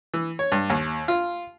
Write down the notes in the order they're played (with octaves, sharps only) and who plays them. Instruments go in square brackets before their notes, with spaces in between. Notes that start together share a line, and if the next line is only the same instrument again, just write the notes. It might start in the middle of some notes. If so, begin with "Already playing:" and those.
[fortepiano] E3
C#5
G2
D#2
F4